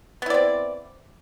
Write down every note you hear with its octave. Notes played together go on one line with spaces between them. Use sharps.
B3 C4 E4 D5